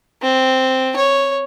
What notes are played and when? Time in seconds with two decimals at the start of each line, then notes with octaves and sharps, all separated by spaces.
0.22 C4
0.96 C#5